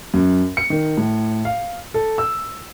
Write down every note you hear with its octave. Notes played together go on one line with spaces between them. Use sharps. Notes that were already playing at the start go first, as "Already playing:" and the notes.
F#2
C#7
D#3
A2
F5
A4
E6